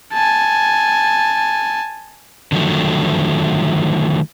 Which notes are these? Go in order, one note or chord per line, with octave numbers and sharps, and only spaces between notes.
G#5 A5
D3 D#3 F3 F#3 A3